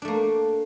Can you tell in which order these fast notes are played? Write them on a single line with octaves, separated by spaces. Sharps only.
D4 A3 A#3